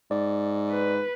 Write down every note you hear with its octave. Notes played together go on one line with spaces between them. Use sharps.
G#2 D5
B4